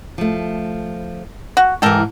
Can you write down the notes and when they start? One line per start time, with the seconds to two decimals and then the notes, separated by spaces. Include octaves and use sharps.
0.18 F3 A3
1.57 F#4
1.82 G#2 E3 G4 A4 A#4